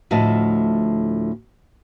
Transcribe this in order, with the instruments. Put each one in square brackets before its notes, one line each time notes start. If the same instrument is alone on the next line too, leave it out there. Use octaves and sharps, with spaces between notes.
[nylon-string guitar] D2 A2 F3 A3 D#5 A5